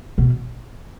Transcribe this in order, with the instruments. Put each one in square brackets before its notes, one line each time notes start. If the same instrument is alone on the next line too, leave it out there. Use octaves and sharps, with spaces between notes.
[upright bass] B2